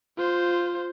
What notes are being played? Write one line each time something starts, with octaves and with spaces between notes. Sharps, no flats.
F4 C5